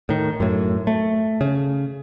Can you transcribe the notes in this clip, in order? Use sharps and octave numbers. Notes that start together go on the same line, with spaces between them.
A2 D#3
F#2 A2
A3
C#3